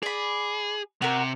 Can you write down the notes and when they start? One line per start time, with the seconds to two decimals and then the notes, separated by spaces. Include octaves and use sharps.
0.03 G#4 D5 B5
1.02 C3 F#4 A#4